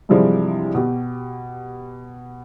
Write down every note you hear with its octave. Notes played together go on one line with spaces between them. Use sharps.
G2 C3 E3 F3 G3 G#3
B2 G4